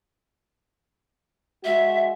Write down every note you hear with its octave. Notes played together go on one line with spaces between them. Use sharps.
G#3 F#4 E5